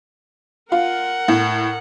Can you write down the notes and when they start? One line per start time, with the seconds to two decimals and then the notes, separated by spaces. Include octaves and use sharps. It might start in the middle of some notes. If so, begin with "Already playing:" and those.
0.72 F4 A#4 F#5
1.28 A2